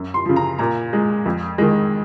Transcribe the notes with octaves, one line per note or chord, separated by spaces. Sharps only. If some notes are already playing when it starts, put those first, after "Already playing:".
Already playing: F#2
C6
C#3 F3
A#5
A#2 A#5
G#3
F2
D#3 G#3